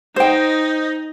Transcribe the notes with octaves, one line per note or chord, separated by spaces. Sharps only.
D#4 C5 D#5 G5